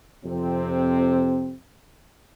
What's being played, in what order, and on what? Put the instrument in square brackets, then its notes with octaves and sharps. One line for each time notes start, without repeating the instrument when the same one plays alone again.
[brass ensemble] F2 C3 C4